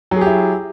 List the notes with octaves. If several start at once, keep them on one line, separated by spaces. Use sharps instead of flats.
F#3 E4 G4 G#4